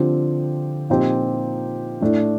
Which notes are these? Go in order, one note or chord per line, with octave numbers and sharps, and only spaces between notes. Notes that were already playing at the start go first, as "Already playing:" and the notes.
Already playing: D3 F3 C4 G4
A#2 F3 C4 D#4 G4
A2 A3 D4